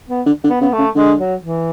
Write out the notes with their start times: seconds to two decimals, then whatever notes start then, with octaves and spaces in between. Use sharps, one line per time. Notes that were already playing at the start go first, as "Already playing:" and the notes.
0.10 B3
0.26 D3
0.44 D3
0.50 B3
0.61 C#3 B3
0.73 A3
0.78 C#3
0.95 D3 G#3
1.19 F#3
1.41 E3